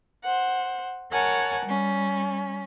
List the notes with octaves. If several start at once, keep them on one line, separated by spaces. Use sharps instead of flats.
C5 F#5
A#4 C#5 F#5 G#5 A5
G3 C#4